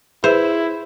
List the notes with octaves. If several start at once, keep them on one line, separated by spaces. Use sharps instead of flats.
E4 G#4 B4 C5 E5